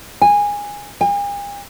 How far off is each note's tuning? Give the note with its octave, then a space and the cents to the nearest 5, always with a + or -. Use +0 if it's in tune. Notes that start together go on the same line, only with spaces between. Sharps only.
G#5 -15
G#5 -45